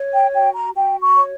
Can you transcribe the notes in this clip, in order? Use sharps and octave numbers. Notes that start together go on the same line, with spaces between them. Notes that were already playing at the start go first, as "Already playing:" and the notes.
Already playing: C#5
G5
F#4 G5
A#5
F#4 G5
C#6
C#5